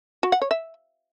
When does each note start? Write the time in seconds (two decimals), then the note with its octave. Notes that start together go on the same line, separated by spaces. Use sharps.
0.23 F#4
0.32 F#5
0.42 C#5
0.51 E5